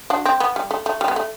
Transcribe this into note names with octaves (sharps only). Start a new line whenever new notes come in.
D4 F#4
C4
B3
G3
A3
A3
G3
B3
A3